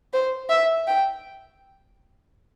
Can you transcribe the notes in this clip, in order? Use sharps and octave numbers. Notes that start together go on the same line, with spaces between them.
C5
E5
G5